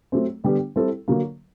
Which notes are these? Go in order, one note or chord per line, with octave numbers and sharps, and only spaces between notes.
F#3 A3 C4
D3 G3 B3 D4 G4
G3 C4 E4 A4
D3 F#3 A#3